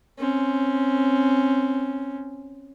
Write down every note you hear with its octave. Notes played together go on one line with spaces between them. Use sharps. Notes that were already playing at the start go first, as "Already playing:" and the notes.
C4 C#4